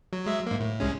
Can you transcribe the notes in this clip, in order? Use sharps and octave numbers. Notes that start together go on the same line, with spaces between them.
F#3
F#3 G#3 E5
G#2 A#3
A2
C2 G#3 C#4